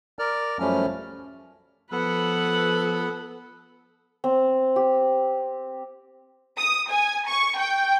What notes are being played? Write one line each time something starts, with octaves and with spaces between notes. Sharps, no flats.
A#4 D5 F6
F#2 F3 G3 A3 C#4 F6
F3 B3 A4 B4 F#5
C4
G4
D#6
G#5
C#6
G5